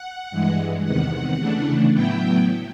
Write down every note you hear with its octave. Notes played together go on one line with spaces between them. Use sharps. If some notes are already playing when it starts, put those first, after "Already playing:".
Already playing: F#5
G2 E3 G#3
E2 C3 D#3 F#5
C#3 E3 A3 D4
A2 F#3 B3 E4 G5